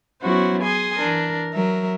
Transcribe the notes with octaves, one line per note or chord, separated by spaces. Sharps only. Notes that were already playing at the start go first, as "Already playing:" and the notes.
F#3 B3 C#4 E4 F#4 C5
G#4 G#5 C6 D#6
E3 D4 A#4
F#3 A#4 E5